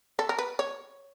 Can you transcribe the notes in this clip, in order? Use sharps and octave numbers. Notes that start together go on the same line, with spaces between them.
A4
A#4
B4
C#5